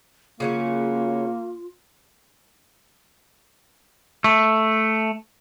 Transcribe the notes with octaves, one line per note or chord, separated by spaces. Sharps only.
C#3 F#3 A#3 C#4 F4
A3